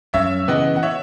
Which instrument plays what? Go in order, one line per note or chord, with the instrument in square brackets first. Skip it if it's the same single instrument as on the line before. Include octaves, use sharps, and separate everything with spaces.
[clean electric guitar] F#2 [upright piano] C#5 E5
[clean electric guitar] C#3 E3 B3 [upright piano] D#5 F#5
[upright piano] F#5
C#5 E5